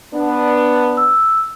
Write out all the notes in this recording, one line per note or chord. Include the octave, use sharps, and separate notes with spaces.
B3 D4
E6